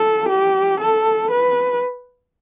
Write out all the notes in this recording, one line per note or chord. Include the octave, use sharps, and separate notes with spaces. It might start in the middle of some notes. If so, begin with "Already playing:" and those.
Already playing: A4
G4
A4
B4